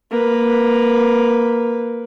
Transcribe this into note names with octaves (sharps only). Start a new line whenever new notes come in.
A#3 B4